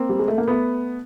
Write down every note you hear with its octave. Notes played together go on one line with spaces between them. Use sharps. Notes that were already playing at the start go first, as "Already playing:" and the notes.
Already playing: A#3 C4
G3
G#3
A3
A#3
A3 B3